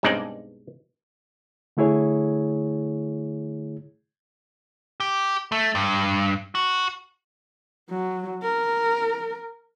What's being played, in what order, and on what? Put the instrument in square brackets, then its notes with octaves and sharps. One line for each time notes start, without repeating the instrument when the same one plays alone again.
[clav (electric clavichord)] B1 G2 G#3 C4 D#4 D5
[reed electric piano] D3 A3 E4 G#4 C#5
[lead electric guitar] G4
A3
G2
F#4
[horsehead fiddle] F#3
A#4